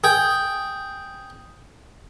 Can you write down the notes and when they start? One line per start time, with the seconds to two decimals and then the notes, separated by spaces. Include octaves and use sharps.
0.04 G#4 G5